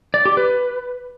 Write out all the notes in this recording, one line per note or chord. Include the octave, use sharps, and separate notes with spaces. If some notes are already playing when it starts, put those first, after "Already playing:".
D5
G4
B4